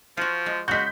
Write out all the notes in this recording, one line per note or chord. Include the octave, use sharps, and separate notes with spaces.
F3 F4 F#4
G#3
C#3 G#3 F#4 G6 B6